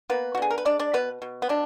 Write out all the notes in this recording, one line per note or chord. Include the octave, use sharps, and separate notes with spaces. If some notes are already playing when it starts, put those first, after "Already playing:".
A#3 B3 B4
F#4
D3 G#4
A#4
B4
G#3 D4 D5
D4 D5
B2 B3 B4
B2
B3
B2 D4